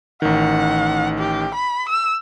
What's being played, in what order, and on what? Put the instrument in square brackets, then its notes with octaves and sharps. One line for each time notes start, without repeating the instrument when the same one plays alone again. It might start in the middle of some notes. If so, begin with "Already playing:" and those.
[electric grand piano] A1 D#3 [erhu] F#5
[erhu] G4
B5
E6